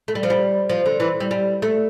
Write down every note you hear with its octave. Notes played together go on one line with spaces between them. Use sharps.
A3
G3
F3
G3
F3
D3
E3
G3
G3
A3